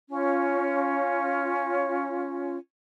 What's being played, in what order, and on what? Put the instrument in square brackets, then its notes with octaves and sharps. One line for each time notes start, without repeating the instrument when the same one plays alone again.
[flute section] C#4 F4